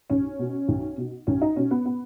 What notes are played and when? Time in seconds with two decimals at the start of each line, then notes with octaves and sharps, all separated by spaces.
0.10 B1 C#4
0.39 B2
0.68 B1
0.98 B2
1.27 B1 C#4
1.42 D#4
1.56 B2 C#4
1.71 B3
1.85 B3